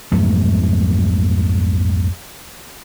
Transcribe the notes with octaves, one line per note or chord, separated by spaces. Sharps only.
B1 F2 G#2 A3